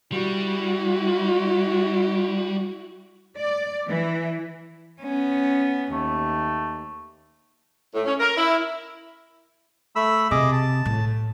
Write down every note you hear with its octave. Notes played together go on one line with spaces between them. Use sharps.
G3 E4 F#4
D5
E3
B3 C#4
D#2 A3
A2
C#4
A#4
E4
A3 B5 E6
C3 G#4 D#5 D6
A5
A2